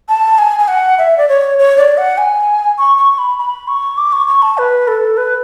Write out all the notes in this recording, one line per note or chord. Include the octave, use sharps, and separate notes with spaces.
A5
G#5
G#5
F#5
E5
D5
C#5
C#5
D5
F#5
G#5
C#6
C#6
B5
B5
C#6
D6
C#6
C#6
A5
B4
A4
B4